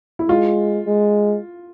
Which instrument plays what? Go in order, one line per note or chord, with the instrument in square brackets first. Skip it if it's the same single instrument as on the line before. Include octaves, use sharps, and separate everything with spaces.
[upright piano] E4
[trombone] G#3 [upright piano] F4
[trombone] G#3